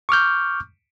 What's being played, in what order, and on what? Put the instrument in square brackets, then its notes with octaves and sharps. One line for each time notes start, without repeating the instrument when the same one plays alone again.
[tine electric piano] C#6 D6 F6 G6